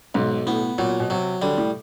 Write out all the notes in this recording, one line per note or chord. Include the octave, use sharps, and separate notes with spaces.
B1 G#2
A2 B3
A#2 F#3
B2
C3 F#3
D3 G3
A2